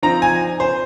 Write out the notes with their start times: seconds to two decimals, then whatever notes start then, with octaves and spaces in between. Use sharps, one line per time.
0.03 F3 C4 D#4 A#5
0.22 G#5
0.60 C5